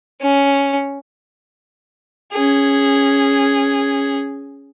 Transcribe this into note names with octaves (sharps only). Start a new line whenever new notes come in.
C#4
C#4 G#4